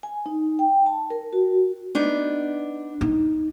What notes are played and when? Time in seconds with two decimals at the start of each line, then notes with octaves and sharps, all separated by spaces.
0.03 G#5
0.26 D#4
0.59 G5
0.86 A5
1.10 A#4
1.33 F#4
1.95 B3 D4 D#4
3.01 D#4